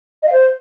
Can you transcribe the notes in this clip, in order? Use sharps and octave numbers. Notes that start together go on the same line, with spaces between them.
D#5
F5
C5